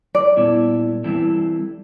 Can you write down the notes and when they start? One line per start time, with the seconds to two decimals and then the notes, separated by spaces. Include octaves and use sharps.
0.15 D5
0.37 A#2 G3 B3 E4 A4
1.04 E3 G3 C4 E4 A4